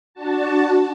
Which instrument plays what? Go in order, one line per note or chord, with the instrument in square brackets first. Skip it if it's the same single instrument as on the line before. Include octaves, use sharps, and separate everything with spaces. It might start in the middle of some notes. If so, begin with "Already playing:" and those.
[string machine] D4 F#4 A5